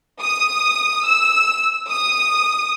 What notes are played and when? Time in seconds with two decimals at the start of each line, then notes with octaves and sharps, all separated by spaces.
0.22 D#6
1.05 E6
1.89 D#6